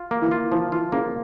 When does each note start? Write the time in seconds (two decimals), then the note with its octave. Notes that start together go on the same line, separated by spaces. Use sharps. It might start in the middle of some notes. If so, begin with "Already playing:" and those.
Already playing: F4
0.11 A#3
0.22 E3
0.31 F4
0.52 E3 F3
0.72 E3 F4
0.92 C#3 A#3